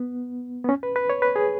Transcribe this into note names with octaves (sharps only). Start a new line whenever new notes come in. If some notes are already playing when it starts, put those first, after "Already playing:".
Already playing: B3
B3
C#4
B4
B4
C#5
B4
G#4